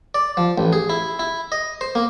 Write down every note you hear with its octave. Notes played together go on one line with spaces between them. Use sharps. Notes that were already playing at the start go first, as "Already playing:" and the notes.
D5
F3
A1
G#4
E4
E4
D#5
C5
A#3